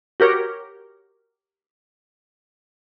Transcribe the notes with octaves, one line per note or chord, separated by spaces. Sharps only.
F#4 G4 A#4 C#5